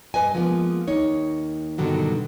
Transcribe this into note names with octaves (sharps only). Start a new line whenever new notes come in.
G2 E3 B4 D#5 G#5
F3 G#3 A#3 B3
D#2 D#4 C#5
G2 B2 D3 D#3 F#3